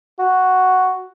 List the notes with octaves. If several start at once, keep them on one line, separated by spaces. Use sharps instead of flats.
F#4